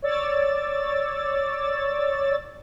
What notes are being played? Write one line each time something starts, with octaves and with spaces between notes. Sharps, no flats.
C#5 D5 E6 A6